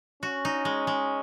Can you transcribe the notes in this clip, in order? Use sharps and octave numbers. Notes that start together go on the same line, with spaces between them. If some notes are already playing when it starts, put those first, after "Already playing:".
C#4 F#4
D#4
G#3
G#3